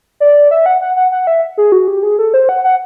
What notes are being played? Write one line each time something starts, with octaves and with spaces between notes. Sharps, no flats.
D5
E5
F#5
F#5
F#5
F#5
E5
G#4
F#4
G4
G#4
A4
C5
F#5
F#5